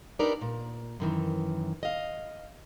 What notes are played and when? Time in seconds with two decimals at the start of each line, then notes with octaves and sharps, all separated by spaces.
0.19 D4 D#4 G4 A#4 B4 D5
0.41 A#2
1.00 F#2 D#3 E3
1.83 D#5 F5